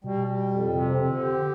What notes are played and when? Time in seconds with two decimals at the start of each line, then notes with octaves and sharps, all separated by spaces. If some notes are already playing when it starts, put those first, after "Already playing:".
0.04 B2 G3
0.27 G3
0.51 F2
0.75 C3 C4
0.98 C4
1.10 D3
1.21 G4